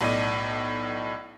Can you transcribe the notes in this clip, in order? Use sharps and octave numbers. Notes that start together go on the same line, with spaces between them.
B1 A2 D5 D#5 D#7